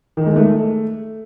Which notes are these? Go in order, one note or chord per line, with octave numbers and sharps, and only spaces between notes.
D#3
G#3
A3